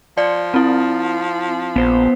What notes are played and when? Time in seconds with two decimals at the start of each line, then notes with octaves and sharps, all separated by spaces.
0.18 F3 D5
0.54 C4 E4
1.76 A#1 B3 C5